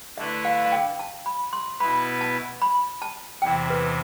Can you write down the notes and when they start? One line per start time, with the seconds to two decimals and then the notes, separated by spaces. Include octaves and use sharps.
0.17 D3 A3 E4 B4 E5
0.45 F5
0.65 F5
0.72 G5
0.99 A5
1.26 B5
1.53 C6
1.80 B2 B3 E4 B4 B5
2.21 A5
2.62 B5
3.02 A5
3.42 E2 C3 E3 G5
3.70 B4